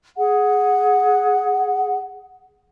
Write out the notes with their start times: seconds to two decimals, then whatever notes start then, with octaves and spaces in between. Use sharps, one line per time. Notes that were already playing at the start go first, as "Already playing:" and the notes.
0.17 G#4 F#5